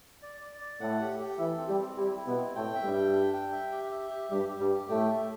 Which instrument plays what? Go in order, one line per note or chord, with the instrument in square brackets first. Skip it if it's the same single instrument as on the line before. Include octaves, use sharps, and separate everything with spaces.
[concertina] D5
D5
D5
[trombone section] A2 A3 [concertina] F#5
[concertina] G4
G4
[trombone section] E3 E4 [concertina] A4
[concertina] C4
[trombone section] G3 G4
[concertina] C4
[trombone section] G3 G4 [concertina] E4
[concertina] E4
[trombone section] B2 B3
[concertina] C4
[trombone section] A2 A3 [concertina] G5
[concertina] E5
[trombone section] G2 G3
[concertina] G5
D4
G5
E5
G4
E5
G4
[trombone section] G2 G3 [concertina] G4
[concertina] G4
[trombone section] G2 G3
[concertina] G4
[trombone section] A2 A3 [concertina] G5
[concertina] E5